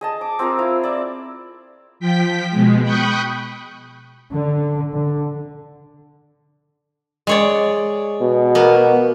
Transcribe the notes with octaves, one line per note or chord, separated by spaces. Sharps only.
G#4 D#5 A5
D6
C4 F4 G#4 A#4
E4 F5
D5 E5
F3 G5 B6
B2 G#3
G5 B5 C#6 D#6 F#6 G6
D3
D3
G#3 C#5 D5
B2
A#3 B3